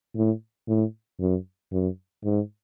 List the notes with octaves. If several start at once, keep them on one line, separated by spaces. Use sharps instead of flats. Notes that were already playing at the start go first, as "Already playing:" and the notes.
A2
A2
F#2
F#2
G#2